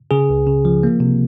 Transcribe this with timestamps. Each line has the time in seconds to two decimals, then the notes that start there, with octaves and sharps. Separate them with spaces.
0.11 C#3 G#4
0.30 C#2
0.47 C#3
0.65 F3
0.83 A#3
1.00 C3